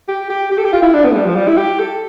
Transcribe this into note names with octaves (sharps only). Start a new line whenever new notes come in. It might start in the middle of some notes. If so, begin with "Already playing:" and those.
G4
G4
G4
A4
G4
F4
E4
D4
B3
A3
G3
F3
G3
E4
G4
A4